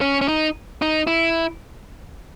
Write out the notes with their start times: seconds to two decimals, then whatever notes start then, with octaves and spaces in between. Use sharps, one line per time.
0.01 C#4
0.21 C#4
0.28 D#4
0.82 D#4
1.07 E4